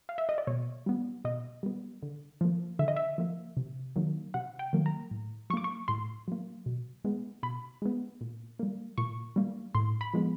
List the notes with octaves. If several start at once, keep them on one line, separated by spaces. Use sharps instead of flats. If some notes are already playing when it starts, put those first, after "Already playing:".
F5
E5
D#5
D5
B2 C#5
G3 B3
B2 D#5
G3 B3
D3
F3 A#3
D3 E5
D#5
E5
F3 A#3
C3
D#3 F#3 A#3
C3 F#5
G5
D#3 F#3 A#3
A#5
A2
F#3 A#3 C#6 D6
C#6
A2 C6
F#3 A#3
B2
G#3 B3
B2 B5
G#3 B3
A#2
G3 A#3
A#2 C#6
G3 A#3
A2 C6
B5
F3 G#3 B3